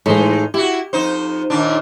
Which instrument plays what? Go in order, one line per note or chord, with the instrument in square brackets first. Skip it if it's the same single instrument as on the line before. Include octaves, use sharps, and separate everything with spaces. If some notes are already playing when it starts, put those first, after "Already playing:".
[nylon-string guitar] A2 G#3 [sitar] E3 D#4
[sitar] E4 F#4 [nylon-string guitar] G4
[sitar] F2 D#4 C5
D#2 A#2 D4